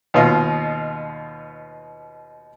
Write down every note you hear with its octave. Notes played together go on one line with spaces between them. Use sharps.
D#2 B2 F4 D#5